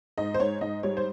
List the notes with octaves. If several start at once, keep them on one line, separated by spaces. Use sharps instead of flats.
G#2 D#5
C5
G#2 C#5
G#2 D#5
G3 C#5
C5